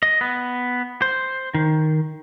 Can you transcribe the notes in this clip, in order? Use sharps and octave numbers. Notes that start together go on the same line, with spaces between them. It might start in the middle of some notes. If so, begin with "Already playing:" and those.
D#5
B3
C5
D#3